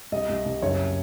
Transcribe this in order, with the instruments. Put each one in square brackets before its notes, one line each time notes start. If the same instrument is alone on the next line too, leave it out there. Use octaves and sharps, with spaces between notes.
[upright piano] C2 D#5
C2
C2
F#1 C#5